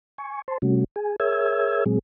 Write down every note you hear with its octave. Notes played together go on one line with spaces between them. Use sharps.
G#5 C#6
C5 A5 C6
C3 G3 A3 C#4 F#4
G#4 G#5
G#4 A#4 C#5 E5 E6 G#6
A#2 F#3 G#3 C4 G#4